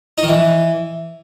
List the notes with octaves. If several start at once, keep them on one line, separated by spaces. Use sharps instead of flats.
D#4
D#3
E3